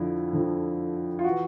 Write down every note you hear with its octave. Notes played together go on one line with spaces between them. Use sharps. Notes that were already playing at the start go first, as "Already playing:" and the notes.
Already playing: F2 D3 F3 E4
F2 D3 F3
F4
E3 F#4